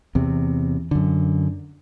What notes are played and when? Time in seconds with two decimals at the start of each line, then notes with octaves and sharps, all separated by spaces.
0.15 E2 C3
0.91 F#2 D3